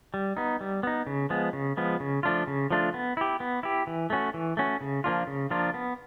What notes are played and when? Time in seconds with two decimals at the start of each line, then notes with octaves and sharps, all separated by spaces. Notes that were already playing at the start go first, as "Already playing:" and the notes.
0.14 G3
0.37 B3 D#4
0.61 G3
0.83 B3 D#4
1.07 C#3
1.30 F3 G#3 B3
1.53 C#3
1.77 F3 G#3 B3
2.00 C#3
2.23 F3 A3 D4 F4
2.47 C#3
2.70 F3 A3 D4 F4
2.94 B3
3.17 E4 G4
3.40 B3
3.63 E4 G4
3.87 E3
4.10 A3 C#4 F#4
4.34 E3
4.57 A3 C#4 F#4
4.81 C#3
5.04 F3 A#3 D4 F4
5.27 C#3
5.50 F3 A#3 D4 F4
5.74 B3